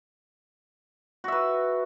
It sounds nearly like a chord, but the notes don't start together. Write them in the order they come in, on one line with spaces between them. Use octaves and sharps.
F#4 E5 B4